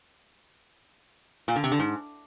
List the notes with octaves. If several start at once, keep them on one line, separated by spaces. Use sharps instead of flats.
A#2
D3
C3
D3
G#2